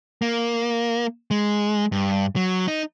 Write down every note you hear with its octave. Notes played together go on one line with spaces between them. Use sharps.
A#3
G#3
G2
F#3
D#4